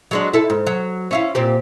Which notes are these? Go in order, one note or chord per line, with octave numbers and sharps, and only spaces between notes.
F#3 G#3 D4
E4 A4
G#2
F#3
C#4 E4 F4
A#2 C4 G4